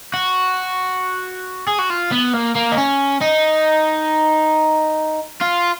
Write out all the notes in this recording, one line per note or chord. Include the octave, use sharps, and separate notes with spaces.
F#4
G#4
F#4
F4
B3
A#3
A#3
D#4
C#4
D#4
F4